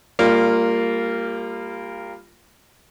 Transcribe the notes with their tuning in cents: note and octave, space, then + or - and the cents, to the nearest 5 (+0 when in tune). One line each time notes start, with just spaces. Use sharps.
G3 +20 A#3 -15 F4 +0